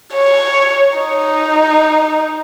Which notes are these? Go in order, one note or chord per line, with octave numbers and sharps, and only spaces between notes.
C#5
D#4